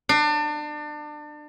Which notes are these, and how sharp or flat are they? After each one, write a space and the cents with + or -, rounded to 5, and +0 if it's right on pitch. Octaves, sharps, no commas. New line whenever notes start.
D4 +30